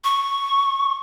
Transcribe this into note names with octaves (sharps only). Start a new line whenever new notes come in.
C#6